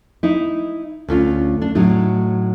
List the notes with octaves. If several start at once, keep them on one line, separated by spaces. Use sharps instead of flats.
D#4 E4
D2 C#4 F4
D4
A2 F#3 D#4